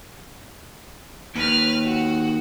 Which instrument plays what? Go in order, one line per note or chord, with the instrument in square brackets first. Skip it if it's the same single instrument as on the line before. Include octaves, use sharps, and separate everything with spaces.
[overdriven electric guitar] D#2 [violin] B4 F6
[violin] F#4